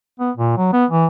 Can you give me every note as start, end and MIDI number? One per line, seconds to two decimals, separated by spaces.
0.20 0.31 59
0.37 0.53 46
0.57 0.70 54
0.73 0.86 59
0.91 1.07 52